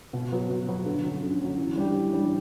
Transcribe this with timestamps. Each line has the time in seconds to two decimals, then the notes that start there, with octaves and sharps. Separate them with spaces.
0.13 B2
0.32 F#3 B3 F#4
0.50 B2
0.68 F#3 B3 F#4
0.86 D3
1.04 F#3 C#4
1.23 D3
1.41 F#3 C#4
1.58 E3
1.76 G3 D4 G4
1.94 E3
2.12 G3 D4 G4